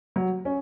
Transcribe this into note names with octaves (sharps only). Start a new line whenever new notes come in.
F#3
C#4